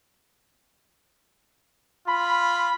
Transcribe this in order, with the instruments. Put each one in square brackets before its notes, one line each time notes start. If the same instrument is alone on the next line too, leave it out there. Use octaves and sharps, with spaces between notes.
[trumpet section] F4 B5